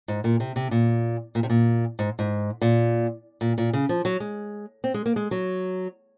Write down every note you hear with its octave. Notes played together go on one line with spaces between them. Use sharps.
G#2
A#2
C3
C3
A#2
A#2
C3
A#2
G#2
G#2
A#2
A#2
A#2
C#3
F3
F#3
G#3
C4
G#3
A#3
G#3
F#3